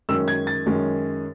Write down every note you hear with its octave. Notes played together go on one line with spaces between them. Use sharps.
F#2 D#3 G#3 C#4 E6
G#6
A6
F#2 D#3 G#3 C#4